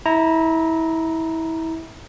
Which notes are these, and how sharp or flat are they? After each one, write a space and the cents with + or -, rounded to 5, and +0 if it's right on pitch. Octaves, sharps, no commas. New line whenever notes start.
E4 -25 A#5 +0